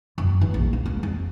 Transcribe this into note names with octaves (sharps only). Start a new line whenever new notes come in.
F#2
E3
A#1
A#3
C#2
F2